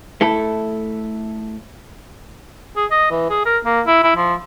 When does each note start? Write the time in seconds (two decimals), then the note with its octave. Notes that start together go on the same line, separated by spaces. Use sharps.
0.21 A3 E4 A4
2.77 G#4
2.91 D#5
3.11 E3
3.30 G#4
3.46 A#4
3.65 A#3
3.86 E4
4.03 E4
4.16 F3